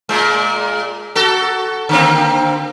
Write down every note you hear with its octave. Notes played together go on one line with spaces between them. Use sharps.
A#2 G#3
F#4 A4
D3 A#3 C4